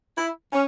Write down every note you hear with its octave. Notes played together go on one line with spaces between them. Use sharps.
E4
C#4